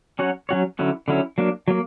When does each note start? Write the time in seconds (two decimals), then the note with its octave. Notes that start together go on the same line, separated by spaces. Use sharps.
0.19 F#3 C#4 F#4 C#5
0.49 F#3 C#4 F#4 C#5
0.79 D3 F#3 C#4 E4
1.08 D3 F#3 C#4 E4
1.38 F#3 A#3 D4
1.68 F#3 A#3